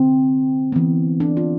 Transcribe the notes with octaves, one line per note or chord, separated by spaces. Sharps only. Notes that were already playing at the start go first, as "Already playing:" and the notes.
Already playing: D3 C4
E3 B3
D4
F4